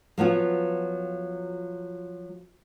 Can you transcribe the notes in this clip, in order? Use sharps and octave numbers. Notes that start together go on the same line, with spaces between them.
F3 F#3 B3 F4